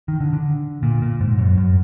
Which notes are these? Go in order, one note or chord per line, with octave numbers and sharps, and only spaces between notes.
D#3
D3
D3
A#2
A#2
G#2
F#2
F#2